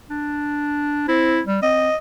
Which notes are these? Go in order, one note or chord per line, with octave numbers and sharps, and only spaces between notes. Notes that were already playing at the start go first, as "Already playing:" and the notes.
D4
C4 E4
G3
C4 D#5